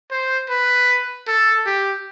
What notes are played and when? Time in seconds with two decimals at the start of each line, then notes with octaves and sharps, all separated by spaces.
0.11 C5
0.50 B4
1.28 A4
1.66 G4